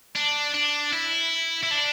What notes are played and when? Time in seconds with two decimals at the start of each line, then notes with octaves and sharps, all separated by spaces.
0.15 D4
0.54 D4
0.93 E4
1.63 E4
1.71 D4